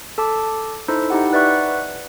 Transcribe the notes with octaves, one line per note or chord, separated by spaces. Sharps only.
A4 A5 D6
D#4 E4 A4 C5
D#4 E4 G4 F#5
B4 D5 E5 F#5 C#6 F#6